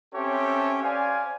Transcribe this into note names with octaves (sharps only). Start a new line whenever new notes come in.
C4 C#4 G4 A4 C#5 E5
C5 D5 F5 G#5